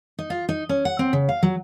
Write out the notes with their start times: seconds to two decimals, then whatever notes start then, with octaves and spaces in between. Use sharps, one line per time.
0.19 D#4
0.30 F4
0.49 D#4
0.69 C#4
0.85 F#5
0.99 C4
1.13 C#3
1.29 F5
1.43 F#3